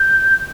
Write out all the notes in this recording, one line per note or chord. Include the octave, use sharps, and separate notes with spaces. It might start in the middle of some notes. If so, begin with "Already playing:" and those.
Already playing: G6